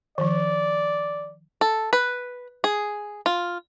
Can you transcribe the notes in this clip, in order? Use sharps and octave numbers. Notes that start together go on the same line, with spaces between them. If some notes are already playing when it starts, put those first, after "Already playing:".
D#3 F3 D5
A4
B4
G#4
F4